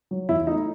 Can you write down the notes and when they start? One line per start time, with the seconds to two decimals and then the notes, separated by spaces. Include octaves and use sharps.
0.11 F#3
0.29 E2 E4
0.47 A3 D#4